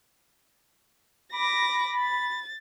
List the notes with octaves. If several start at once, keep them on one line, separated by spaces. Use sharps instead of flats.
B5 D6 A#6
A6